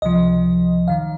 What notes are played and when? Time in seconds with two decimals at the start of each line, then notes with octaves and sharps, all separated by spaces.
0.02 C#2 C3 F3 D#5
0.88 F#2 D#3 F5